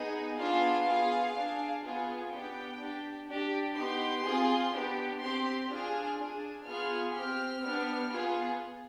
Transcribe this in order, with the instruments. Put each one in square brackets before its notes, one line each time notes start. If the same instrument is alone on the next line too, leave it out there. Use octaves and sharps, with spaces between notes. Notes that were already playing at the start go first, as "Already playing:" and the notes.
Already playing: [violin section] B3 D#4 G#4
B3 D4 F4 G#4 F5
B3 F4 G#4
D4 G#4
B3 F4 G#4
B3 D4 G4 G5
D4 G4
D4 G4
B3 D#4 G4 C6
C4 F4 G#4
B3 D4 G4
C4 G4 C6
D4 F4 G#4 F6
D4 G#4
B3 F4 G#4 F6
C4 G4 F6
B3 D4 G4
B3 F4 G#4